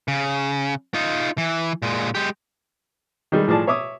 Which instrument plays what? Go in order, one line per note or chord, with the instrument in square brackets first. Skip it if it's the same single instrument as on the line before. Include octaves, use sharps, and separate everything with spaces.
[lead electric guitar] C#3
D#4 F4
E3
A#2 G#3
G#3 G4
[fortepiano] D#3 G3 G#3
A2 F3 G#4 D5 A5
C#5 E5 D6 D#6